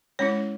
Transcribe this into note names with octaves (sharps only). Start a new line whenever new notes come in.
G#3 C#4 E4 C#5